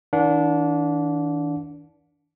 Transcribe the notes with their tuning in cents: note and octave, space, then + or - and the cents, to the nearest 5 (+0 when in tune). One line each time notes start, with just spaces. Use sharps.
D#3 +45 D4 -20 F#5 -45